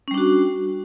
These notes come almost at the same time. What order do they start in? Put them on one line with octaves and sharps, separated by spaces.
C#4 G3 D4 F#4